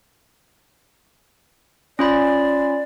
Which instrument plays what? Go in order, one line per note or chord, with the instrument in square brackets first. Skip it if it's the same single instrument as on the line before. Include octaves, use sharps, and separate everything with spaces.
[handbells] C#4 F4 B5 [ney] D5